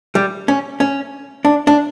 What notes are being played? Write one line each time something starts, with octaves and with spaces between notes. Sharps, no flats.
G3
C#4
C#4
D4
D4